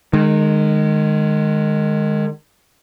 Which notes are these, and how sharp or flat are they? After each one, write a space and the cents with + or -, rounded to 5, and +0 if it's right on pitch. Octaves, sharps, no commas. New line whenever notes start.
D#3 -30 G#3 +0